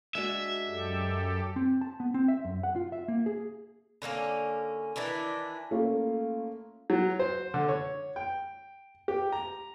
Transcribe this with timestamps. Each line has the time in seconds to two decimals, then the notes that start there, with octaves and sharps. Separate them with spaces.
0.15 G#3 D4 F#4 E5
0.67 F#2 G4 A4
1.56 C4
1.81 A5
2.00 B3
2.14 C4
2.28 E5
2.45 F#2
2.63 F#5
2.76 F4
2.92 E5
3.08 A#3
3.26 G#4
4.02 D3 A3 A#3 C#4
4.96 D#3 E3 D4 E4
5.71 A3 A#3 C#4 F4
6.90 F#3
7.19 C5
7.54 D3
7.69 C#5
8.16 G5
9.08 G4
9.32 A#5